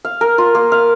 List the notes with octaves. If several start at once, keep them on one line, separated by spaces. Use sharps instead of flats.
F5
A#4
F4
A#3
F5